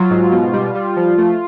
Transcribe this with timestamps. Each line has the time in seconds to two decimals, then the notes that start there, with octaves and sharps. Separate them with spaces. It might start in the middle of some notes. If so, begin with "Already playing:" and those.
Already playing: F#3 F4
0.10 G#2
0.32 B2
0.53 G3
0.75 G3
0.96 F3
1.18 A3